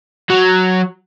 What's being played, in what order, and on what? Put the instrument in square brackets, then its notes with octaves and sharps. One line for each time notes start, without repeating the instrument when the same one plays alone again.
[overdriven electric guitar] F#3